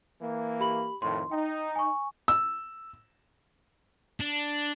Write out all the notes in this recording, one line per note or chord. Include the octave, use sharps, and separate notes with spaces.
E3 A#3
G4 B5 F#7
F2 A2 D#3 C6
D#4 G5
G#5 C#6
E6
D4